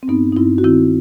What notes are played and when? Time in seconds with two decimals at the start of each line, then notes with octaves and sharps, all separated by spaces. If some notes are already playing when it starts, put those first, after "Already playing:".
0.03 C4
0.08 G2 B3 D#4
0.32 D#4
0.36 G2 C4 E4
0.58 F#4
0.64 D#3 C4 E4